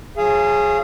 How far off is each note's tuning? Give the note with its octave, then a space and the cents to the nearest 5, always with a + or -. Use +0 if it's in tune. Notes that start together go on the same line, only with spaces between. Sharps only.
F#3 -35 G#4 +0 F5 -35